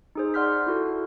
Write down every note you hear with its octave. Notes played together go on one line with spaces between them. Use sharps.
D#4 G#4 C5
D5 F#5 C6 F6 G6 B6
E4 F#4 A4